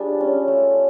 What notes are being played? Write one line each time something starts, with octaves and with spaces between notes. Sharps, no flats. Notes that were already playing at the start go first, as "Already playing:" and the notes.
Already playing: G3 B3 D4 F4 G#4
C#4
A3